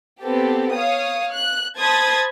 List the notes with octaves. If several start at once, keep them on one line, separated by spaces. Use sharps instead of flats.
B3 C4 G4 A4
C#5 F5 D#6
F#6
C5 A5 B5 D#6 G#6 A6